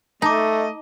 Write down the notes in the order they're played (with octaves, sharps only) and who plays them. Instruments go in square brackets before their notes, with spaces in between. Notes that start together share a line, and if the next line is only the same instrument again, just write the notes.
[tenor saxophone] A3 [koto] D#4 [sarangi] D#5 [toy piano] A5 D6